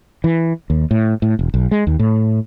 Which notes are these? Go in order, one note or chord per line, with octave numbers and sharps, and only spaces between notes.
E3
D#2
A2
A2
E1
B1
G#3
D#2
A2